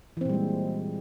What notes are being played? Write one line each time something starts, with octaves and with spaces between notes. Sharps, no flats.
A#2 E3 G3 G#3 C4